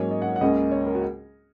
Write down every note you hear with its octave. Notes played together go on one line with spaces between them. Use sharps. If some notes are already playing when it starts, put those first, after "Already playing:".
Already playing: G#2 F#3 A#3 C#4 C#5
D#5
F#5
F#5
C#2 C#3 A#3 C#4 D#5
C#5
A#4
F#4